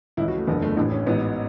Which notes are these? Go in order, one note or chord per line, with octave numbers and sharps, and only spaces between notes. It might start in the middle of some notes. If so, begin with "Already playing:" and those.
C#2 C#3 E3 E4
F#4
A3
F#1 E2 D3 B3
A3
A1 A2 E3 D4
C#4
A1 G#2 E3 B3